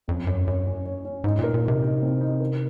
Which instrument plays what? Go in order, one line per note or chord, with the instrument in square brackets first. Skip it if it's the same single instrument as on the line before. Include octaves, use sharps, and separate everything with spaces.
[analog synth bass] F2 [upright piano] C#4
[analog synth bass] F#2 [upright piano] C#5
[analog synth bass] F#2 [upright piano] C#5
[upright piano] C#4
C#5
C#4
[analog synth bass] G#2 [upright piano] D#4
[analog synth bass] A#2
[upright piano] A#4
[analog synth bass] A#2
[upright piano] D#4
[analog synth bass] C3
[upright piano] D#4
C4
D#4
A#4